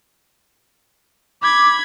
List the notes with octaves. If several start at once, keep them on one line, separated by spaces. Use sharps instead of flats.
B5 D6 G#6